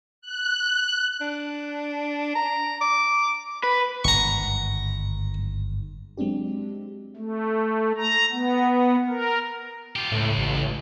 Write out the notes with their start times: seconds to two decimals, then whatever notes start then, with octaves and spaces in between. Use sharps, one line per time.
0.22 F#6
1.21 D4
2.35 A#5
2.81 D6
3.63 B4
4.04 G1 G#2 D#3 A#5 C#6
6.18 F#3 G#3 C4 D4 G4
7.16 A3
7.97 A#5
8.32 B3
9.09 A#4
9.96 F4 G4
10.12 C#2 A2
10.38 A1